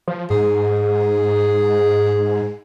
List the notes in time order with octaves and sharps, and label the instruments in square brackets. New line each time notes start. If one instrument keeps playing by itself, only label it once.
[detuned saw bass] F3
[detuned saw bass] G#2 [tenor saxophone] G#4